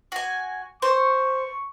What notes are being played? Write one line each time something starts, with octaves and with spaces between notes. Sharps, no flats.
F#4 G#5
C5 C#6